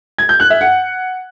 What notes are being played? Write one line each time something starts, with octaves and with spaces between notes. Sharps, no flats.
G#6
G6
F#6
E5
F#5